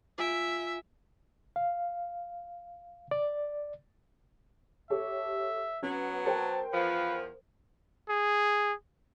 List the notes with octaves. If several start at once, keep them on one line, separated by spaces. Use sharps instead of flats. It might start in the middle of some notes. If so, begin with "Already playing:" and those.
F4 E5 G#5 D7
F5
D5
G4 A4 C#5 E5
F#3 B3 C#4
A#4 C5 G5 A5
E2 F3 B4
G#4